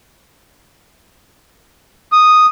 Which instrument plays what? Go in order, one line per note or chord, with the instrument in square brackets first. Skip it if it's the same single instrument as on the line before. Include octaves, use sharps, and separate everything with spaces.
[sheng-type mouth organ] D#6